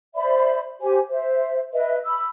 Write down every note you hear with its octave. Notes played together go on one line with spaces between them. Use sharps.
C5 D5 E5 B5
G4 C5 G#5
C5 E5
B4 D#5 E5
B5 E6